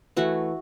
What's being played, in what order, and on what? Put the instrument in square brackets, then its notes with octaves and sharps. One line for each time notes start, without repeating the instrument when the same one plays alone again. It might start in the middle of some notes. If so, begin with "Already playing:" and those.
[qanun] E3 A3 F#4